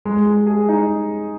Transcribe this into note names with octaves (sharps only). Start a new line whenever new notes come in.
G#3
G#3
G#4
D#4